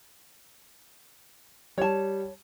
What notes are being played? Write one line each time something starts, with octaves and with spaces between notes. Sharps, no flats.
G3 C#5 A5